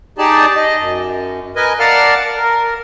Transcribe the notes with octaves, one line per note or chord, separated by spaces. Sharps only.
D#4 G4 G#4 D5 A5
D#5
F#2
A#4 B4 D#5 G#5
A#4 D5 F5 F#5 A5 F6
A#4